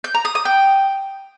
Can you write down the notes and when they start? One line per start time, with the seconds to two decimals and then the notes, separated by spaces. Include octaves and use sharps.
0.04 G6
0.15 A#5
0.25 D#6
0.35 D#6
0.45 G5